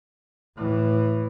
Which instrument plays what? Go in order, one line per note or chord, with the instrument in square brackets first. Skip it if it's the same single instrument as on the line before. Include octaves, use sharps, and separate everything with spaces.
[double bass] A2 E3